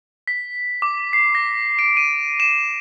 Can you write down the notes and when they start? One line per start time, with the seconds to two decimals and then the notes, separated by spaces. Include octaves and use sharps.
0.28 B6
0.82 D6
1.13 C7
1.35 A#6
1.79 D7
1.97 D#7
2.40 E7